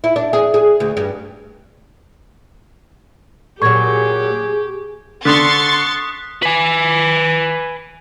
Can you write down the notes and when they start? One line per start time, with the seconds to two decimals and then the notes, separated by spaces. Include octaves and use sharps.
0.04 E4
0.16 D4
0.33 G#4
0.54 G#4
0.80 D2
0.97 G2
3.62 A#2 F#3 G4 G#4 C#6 G#6
5.25 D3 C6 C#6 D#6 F#6 A6 B6
6.42 B4 G#5